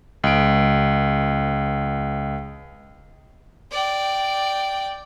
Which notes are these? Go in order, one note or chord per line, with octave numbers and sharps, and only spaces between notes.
C#2 D7
D5 G5